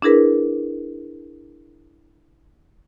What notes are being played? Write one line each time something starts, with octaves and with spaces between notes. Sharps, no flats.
D4 E4 G#4 A#4 B4